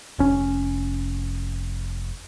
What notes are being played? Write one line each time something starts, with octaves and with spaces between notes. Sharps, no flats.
F1 C#4